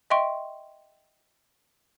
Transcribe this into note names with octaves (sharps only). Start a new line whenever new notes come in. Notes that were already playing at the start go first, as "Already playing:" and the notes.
D#5 E5 G5 C6 C#6 D7